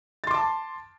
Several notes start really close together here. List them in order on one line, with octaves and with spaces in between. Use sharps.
A6 C6 D6 A5